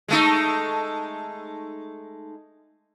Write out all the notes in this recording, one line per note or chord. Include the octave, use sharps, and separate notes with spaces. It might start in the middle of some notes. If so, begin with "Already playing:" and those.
G#3 A3 D#4